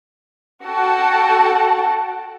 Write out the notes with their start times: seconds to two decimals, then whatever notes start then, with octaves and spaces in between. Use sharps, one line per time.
0.63 F#4 A4 F#5 G5 A5